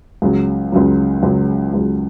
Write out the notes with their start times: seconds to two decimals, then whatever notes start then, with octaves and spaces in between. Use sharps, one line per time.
0.22 C#2 C#3 F#3
0.72 C#2 C#3 F#3
1.22 C#2 C#3 F#3
1.74 C#2 C#3 F#3